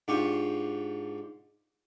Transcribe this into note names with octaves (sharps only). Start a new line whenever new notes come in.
G#2 D4 F4 G4 C#6